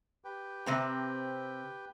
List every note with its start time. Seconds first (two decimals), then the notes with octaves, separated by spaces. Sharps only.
0.24 G4 B4 G5
0.66 C3 C4 A#5